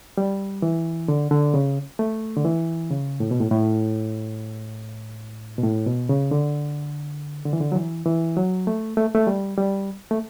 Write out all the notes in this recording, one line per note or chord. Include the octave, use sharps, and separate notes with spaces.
G3
E3
D3
D3
C#3
A3
D3
E3
C#3
A2
B2
A2
A2
B2
A2
B2
C#3
D3
D3
E3
D3
F#3
E3
E3
F#3
A3
A3
A3
G3
G3
A3